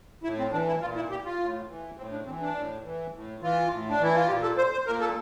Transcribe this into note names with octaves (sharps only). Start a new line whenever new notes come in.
A2 E4
C4
E3 D4
E4
A#2 F4
E4
G4
F4
A2
E3
A2 C4
D4
E3 C4
D4
A2
E3
A2
E3 F4
A2
D4
E3 E4
F4
A#2 G4
A4
C5
C5
A#2 A#4
A4